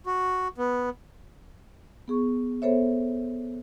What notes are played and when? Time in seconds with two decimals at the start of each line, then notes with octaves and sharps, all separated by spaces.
0.06 F#4
0.58 B3
2.08 B3 G#4 C#6
2.62 B3 A4 C5 C#5 E5